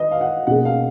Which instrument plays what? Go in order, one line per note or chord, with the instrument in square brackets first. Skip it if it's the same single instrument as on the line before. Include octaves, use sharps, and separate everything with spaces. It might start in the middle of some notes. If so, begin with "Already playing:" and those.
Already playing: [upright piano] D#3 [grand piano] B4 D#5
[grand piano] F5
F#5
[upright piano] B2 A#3 C#4 G#4 [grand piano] F#5
[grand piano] F5